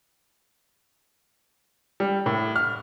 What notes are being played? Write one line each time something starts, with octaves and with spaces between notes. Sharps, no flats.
G3
A2
F6